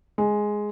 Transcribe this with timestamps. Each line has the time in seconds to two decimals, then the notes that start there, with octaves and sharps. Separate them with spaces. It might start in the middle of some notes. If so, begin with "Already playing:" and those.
0.18 G#3